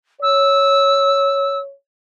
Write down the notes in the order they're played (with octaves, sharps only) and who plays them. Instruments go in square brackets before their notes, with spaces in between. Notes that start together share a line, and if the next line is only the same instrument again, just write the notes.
[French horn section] C#5 [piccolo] E6